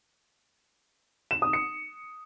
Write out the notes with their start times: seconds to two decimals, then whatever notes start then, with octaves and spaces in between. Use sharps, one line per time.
1.31 E7
1.42 D#6
1.53 C#7